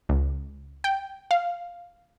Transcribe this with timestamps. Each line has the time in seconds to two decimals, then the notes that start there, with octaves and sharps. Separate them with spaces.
0.09 C#2
0.84 G5
1.31 F5